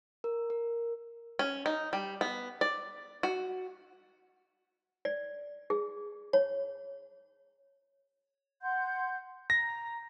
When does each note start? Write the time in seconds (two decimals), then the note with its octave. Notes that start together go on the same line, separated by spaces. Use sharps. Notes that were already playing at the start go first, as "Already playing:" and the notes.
0.24 A#4
0.50 A#4
1.39 C#4
1.66 D#4
1.93 G3
2.21 B3
2.61 D5
3.23 F#4
5.05 D5
5.70 G#4
6.33 C#5
8.62 F#5 C6 G6
9.50 A#5 A#6